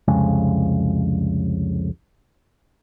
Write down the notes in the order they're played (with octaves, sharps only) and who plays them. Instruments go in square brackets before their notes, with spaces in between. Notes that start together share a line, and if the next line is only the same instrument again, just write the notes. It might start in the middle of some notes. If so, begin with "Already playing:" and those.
[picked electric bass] C2 F2 C#3 G#3